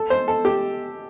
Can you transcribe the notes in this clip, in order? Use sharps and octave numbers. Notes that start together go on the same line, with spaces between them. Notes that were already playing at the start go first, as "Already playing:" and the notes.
Already playing: A4
C5
A4
G4